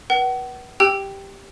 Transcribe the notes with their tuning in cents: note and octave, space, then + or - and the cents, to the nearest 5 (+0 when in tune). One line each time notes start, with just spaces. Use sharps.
B4 -30 F#5 +35
G4 +0 G5 +0 E6 +10